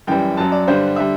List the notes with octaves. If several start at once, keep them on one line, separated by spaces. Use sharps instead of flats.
F#2 E3 G3 G5
F#2 F#3 A5
D5
G2 D3 G3 C5
D3 G3 E5